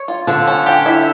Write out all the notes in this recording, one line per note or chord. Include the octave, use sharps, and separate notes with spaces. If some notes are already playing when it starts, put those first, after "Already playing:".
Already playing: C#5
F4
D3 F3
C#4
G4
E4